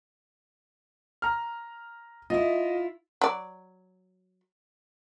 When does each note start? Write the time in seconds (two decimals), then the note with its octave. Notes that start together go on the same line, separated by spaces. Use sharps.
1.22 A#5 F6
2.30 E4 F4 D#5 E5
3.22 F#3 D5